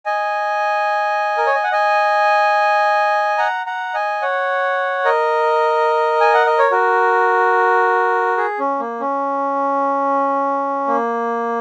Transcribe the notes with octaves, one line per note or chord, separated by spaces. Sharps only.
D#5 G#5
A#4
C#5
D#5
F#5
D#5 G#5
F#5 A#5
F#5 A#5
D#5 G#5
C#5 F#5
A#4 D#5
G#5
F#5
D#5
C#5
F#4 A#4
G#4
C#4
A#3
C#4
A#3